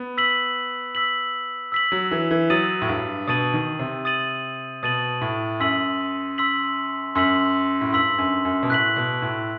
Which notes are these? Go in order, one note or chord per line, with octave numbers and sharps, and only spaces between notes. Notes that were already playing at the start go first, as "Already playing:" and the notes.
Already playing: B3
E6 B6 F#7
E6 B6 F#7
E6 B6 F#7
F#3
E3
E3
F#3 D#6 A6 D#7 F#7
A2
G2
B2 D#6 A6 D#7 F#7
D#3
C3
D#6 A6 D#7 F#7
B2 D#6 A6 D#7 F#7
A2
F#2 C6 E6 B6 F#7
C6 E6 B6 F#7
F#2 C6 E6 B6 F#7
A2
G2 C6 E6 B6 F#7
F#2
F#2
B2
A2 F#6 B6 F#7
B2
A2